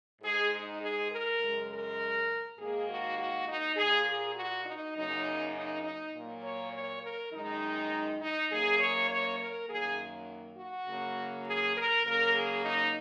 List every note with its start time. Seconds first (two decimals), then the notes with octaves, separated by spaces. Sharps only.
0.22 G#2 G#3 G#4
0.51 D#4
0.82 G#4
1.10 A#4
1.40 F#2 C#3 G#3
1.69 A#4
2.58 G#2 D#3 A#3 G#4
2.88 F#4
3.18 F#4
3.47 D#4
3.76 A#2 A#3 G#4
4.06 G#4
4.36 F#4
4.65 D#4
4.95 F#2 C#3 F#3 A#3 D#4
5.55 D#4
5.83 D#4
6.13 A#2 F#3 A#3
6.43 C#5
6.73 C#5
7.02 A#4
7.33 F#2 D#3 G#3 D#4
8.20 D#4
8.51 F#2 F#3 A#3 G#4
8.80 C#5
9.10 C#5
9.39 A#4
9.69 F#2 D#3 F#3 A#3 G#4
10.57 F#4
10.87 C#3 F#3 A#3
11.46 G#4
11.77 A#4
12.05 C#3 F#3 A#3 A#4
12.35 G#4
12.64 D#4